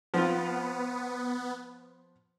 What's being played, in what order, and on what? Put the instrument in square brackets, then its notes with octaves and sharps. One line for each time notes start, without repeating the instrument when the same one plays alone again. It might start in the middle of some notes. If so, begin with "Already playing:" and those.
[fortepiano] F3 C4 F4 [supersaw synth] B3